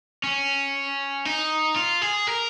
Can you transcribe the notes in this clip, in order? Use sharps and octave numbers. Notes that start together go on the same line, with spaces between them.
C#4
D#4
F4
G#4
A#4